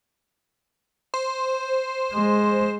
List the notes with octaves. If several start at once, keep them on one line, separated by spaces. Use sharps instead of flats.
C5
G#3